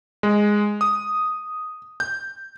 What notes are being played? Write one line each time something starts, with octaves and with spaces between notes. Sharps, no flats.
G#3
D#6
G6